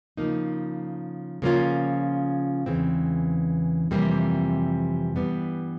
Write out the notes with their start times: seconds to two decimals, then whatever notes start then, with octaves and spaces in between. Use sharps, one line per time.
0.17 C#3 F3 A#3 D#4
1.42 C#3 F3 A#3 C#4 F4
2.66 E2 C#3 E3 G#3 C4
3.91 F2 C3 E3 G3 A#3
5.16 G2 E3 G3 B3